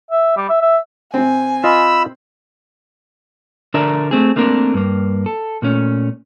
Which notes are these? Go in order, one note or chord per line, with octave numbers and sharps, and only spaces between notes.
E5
G3
E5
E5
C3 C4 G#5
F4 D#5 B5 E6
D3 D4 A#4 D5 E5 A#5
A3 C4 G#4
A3 A#3 C4 D4 A#4
G2 A#3
A4
A#2 A3 C#4